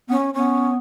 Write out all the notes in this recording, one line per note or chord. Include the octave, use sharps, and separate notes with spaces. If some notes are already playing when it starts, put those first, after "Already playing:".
B3 C#4
B3 C#4